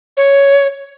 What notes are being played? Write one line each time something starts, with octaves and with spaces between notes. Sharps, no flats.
C#5